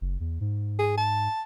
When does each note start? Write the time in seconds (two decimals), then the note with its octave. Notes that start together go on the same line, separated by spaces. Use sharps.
0.01 F#1
0.20 E2
0.41 G#2
0.79 G#4
0.98 A5